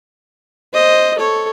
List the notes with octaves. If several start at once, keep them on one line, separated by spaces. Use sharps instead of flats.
C5 D#5
A4 C#5